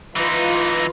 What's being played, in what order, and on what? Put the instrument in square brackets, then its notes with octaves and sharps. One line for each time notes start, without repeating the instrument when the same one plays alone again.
[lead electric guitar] E3 D#4 [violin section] F4 B4